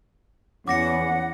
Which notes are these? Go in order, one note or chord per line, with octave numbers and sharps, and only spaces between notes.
E2 C#4 F#5 D6 A#6 C#7